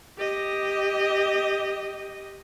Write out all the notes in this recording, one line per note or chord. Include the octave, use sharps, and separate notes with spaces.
G4 D#5